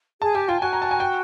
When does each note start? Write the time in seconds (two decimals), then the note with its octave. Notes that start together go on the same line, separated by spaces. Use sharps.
0.21 G#4 A5
0.35 G4 G#5
0.48 F4 G5
0.60 F#4 G#5
0.73 A#5
0.82 A5
0.91 G#5
1.00 G5